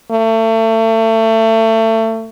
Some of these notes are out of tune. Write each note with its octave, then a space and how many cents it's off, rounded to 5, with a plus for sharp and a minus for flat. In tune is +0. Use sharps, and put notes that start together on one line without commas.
A3 +30